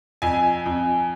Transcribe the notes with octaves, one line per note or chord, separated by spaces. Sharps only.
F2 G#5
F2